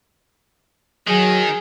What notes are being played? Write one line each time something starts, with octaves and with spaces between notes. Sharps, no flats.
D#3 F#3 G#4